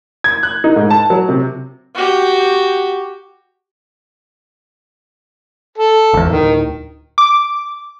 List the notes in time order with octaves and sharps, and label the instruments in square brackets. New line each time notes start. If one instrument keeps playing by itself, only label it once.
[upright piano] G#6
F#6
D#4
G#2
A5
F#3
C3
[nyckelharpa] F#4 G4
[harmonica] A4
[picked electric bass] G#1 E2
[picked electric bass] D1 [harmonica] D#3
[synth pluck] D6